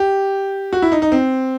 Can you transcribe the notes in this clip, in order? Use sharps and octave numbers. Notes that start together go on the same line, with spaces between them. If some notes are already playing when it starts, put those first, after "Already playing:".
Already playing: G4
F#4
E4
D#4
D#4
C4